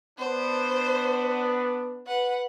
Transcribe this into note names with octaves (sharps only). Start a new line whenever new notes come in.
B3 D4 C5
B4 F#5